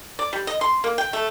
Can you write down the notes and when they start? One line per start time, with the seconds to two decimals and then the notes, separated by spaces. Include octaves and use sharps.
0.19 D5
0.33 G3
0.47 D#5
0.61 C6
0.84 A#3
0.98 G5
1.13 A3